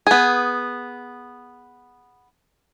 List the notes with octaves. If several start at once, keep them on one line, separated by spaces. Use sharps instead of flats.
B3 G#4